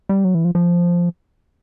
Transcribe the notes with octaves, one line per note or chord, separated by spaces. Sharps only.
G3
F#3
E3
F3
F3